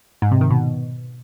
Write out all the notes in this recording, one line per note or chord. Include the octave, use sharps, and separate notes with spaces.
G#2
C3
D#3
B2